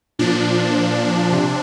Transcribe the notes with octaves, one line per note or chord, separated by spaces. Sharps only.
A#2 F3 D4
C3